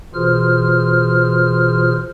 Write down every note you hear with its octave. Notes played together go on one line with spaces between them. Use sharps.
B2 E3 F4 G#4 C5 F6